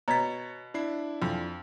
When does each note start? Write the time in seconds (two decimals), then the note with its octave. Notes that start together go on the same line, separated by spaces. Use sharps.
0.08 B2 C#5 A#5 G#6 A6 B6
0.74 D4 E4 C7
1.22 F2